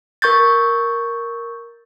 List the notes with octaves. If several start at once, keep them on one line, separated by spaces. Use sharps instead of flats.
A#4 C#6 G6 A6